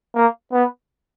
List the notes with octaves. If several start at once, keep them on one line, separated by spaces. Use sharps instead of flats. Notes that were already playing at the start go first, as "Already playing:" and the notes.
A#3
B3